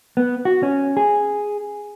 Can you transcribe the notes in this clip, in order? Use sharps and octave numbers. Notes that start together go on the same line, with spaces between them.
B3
F#4
C#4
G#4